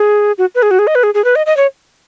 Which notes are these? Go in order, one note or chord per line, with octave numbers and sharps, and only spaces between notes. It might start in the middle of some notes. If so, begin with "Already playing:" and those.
Already playing: G#4
F#4
B4
G#4
F#4
G#4
D#5
B4
G#4
G#4
B4
D#5
D#5
C#5